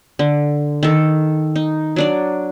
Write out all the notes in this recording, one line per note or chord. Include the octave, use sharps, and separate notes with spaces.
D3
D#3 A4
D#4
F#3 D4 D5